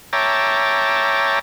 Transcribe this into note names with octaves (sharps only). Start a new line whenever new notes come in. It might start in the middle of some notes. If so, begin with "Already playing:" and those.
C#5 E5 G5 A5 A#5 D6